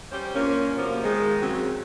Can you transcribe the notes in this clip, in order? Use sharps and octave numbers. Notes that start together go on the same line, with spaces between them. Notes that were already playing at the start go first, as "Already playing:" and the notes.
G3 C#4 G4 C5
A#2 A#3 C#4
F#2 C3 F3 A#3 B3
D#3 G#3
C#3 F#3 C4